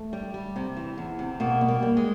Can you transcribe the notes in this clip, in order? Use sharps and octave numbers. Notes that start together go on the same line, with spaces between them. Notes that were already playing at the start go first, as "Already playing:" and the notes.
Already playing: A3
G3
G3
C3
E3
E2
C3
B2 A#3
G3
A#3
G3
G#3